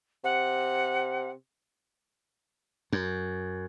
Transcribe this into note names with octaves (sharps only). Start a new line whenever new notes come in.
C3 F#5
F#2